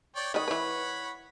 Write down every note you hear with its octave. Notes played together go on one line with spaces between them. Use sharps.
C#5 D5 G5
D#3 C#5 D#5 F#5 B5
E3 B4